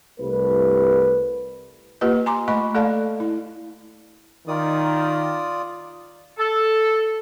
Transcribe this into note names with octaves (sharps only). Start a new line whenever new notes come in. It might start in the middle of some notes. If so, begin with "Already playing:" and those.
C2 A3 B4
A#3 F4 G4 B4 D#5
G#5 A#5 C6 D6
A3 D#5 B5 C#6
A3 A4 D5 F5 A5
E4
D#3 F4 D5 D#6
A4